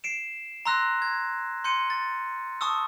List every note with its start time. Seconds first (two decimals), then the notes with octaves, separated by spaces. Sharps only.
0.04 C7 D7 E7
0.65 A#5 C6 E6 F#6 A#6
1.02 G#6
1.64 C6 G6 C#7 D#7
1.90 A6
2.61 A5 C#6 D#6 E6